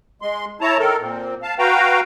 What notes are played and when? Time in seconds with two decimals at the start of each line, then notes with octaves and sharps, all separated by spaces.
0.22 G#3 C6
0.61 E4 C#5 A5 A#5
0.79 D#3 A4 A#4
1.01 A#2 C4
1.42 F5 A5
1.59 F#4 B4 F5 G5 A#5